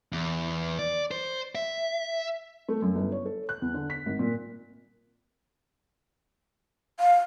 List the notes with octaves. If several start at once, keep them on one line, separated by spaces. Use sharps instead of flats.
E2
D5
C5
E5
A3
F#2
G1
C#5
A4
F#6
E2
D3
B6
G#1
A#2
F5